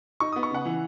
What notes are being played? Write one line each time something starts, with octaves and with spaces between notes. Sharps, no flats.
D#4 C#6
D#6
B3
C#6
C#3 F#5
E3